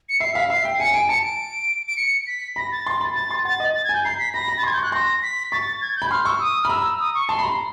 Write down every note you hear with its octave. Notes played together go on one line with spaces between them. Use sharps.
C#7
E5 C7
F5 B6
E5 C7
G5
G#5 C#7
G#5 D7
A5 C#7
D7
D7
C#7
B6
B5 A#6
A6
C6
B5
B5 A6
C6
F#5 A6
D#5
A6
G#6
G#5 G6
A#5 C7
B6
B5 A#6
B5
A6
C6 G#6
G6
C#6 F#6
C6 A#6
B6
C#6 A6
G#6
G6
B5
C6 F6
C#6 E6
D#6
B5 F6
A#5 E6
D#6
C#6
A5 C6
B5
A#5